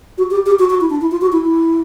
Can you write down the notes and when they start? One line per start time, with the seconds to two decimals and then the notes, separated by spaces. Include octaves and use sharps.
0.18 F#4
0.31 G4
0.46 G4
0.59 F#4
0.70 F#4
0.81 E4
0.90 D4
1.01 E4
1.11 F4
1.21 F#4
1.32 E4
1.43 E4